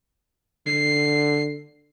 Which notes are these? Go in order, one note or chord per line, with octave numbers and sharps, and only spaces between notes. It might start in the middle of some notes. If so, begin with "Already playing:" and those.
D3 C7